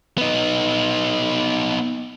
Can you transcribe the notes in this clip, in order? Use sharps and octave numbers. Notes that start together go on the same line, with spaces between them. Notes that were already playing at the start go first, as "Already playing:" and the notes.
B3 D#4